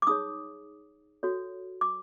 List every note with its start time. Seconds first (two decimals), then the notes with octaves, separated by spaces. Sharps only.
0.02 D6
0.07 D#4 G#4 C#5 D#6
1.23 F#4 A4 C#5
1.81 D6